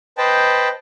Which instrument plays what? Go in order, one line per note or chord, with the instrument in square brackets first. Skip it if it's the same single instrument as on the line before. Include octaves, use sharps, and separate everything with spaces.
[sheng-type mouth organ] B4 C5 D#5 G5 A5